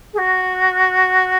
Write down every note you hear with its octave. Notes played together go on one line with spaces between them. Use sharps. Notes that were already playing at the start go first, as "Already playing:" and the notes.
G#4
F#4